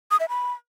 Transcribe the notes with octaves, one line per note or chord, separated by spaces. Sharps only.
D#6
E5
B5